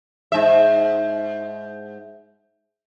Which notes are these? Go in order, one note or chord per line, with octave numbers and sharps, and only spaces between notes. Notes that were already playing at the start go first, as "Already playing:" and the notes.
G#2 E5